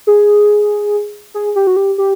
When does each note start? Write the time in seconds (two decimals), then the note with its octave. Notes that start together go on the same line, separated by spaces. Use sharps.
0.07 G#4
1.34 G#4
1.56 G4
1.67 F#4
1.76 G4
1.98 G4